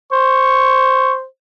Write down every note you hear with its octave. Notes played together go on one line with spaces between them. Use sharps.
C5 C#6